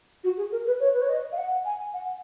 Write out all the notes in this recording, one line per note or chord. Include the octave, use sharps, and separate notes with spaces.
F#4
G#4
A#4
B4
C#5
B4
C#5
D#5
F5
F#5
G#5
F#5